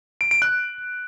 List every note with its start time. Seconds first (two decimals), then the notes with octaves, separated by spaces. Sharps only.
0.21 D7
0.31 D7
0.42 F#6